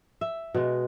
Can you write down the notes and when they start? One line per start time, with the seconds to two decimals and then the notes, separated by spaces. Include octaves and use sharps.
0.21 E5
0.54 B2 G#3